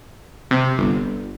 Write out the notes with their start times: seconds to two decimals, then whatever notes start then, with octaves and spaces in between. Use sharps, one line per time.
0.51 C3
0.78 G1